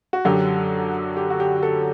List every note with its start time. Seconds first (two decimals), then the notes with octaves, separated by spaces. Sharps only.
0.13 F#4
0.25 F#2 D3 F#3 G4
1.17 G4
1.30 F#4
1.40 G4
1.63 A4